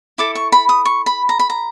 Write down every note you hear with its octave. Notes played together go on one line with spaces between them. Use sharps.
E4 A4 D6
C#6
B5
D#6
C#6
B5
A#5
B5
A#5